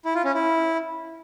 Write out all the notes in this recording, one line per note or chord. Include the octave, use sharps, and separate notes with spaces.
E4
F4
C#4
E4